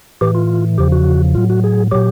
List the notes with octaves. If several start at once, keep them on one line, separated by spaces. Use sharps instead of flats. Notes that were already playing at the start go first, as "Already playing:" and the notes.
A2 E3 G4
F4
E2 C#3 F3 G4
F#4
A2 F#3 F4
F#4
G#4
A#2 F#3 G4